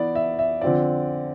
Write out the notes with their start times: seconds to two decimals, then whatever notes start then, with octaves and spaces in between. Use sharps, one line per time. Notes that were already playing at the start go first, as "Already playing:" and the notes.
Already playing: E3 B3 E4 D5
0.15 E5
0.39 E5
0.61 D3 F3 C4 F4 D5